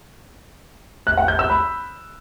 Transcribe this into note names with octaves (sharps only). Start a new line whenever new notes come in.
F#6
F#5
G6
E6
B5